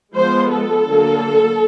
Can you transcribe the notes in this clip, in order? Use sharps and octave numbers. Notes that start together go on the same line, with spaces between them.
F3 G#3 B3 C5
A4
D3 F#3 A#3